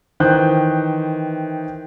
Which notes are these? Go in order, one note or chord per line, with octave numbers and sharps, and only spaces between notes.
D#3 E3 C5 G5 F#6 G6